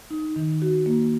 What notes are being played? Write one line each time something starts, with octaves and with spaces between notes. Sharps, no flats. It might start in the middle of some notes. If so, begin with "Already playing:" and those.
D#4
D#3
F#4
A#3